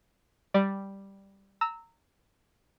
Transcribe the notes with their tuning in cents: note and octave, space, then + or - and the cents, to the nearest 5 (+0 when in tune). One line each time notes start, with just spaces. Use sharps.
G3 +0 D5 +5
A#5 -20 E6 -15